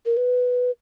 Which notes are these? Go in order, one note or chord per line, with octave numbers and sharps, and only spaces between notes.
A#4
B4